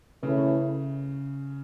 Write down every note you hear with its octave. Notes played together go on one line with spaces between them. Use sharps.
C#3 E3 A3 C#4 E4